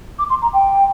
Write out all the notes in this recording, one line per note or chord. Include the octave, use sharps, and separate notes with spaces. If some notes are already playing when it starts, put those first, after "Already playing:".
D6
C6
A#5
G5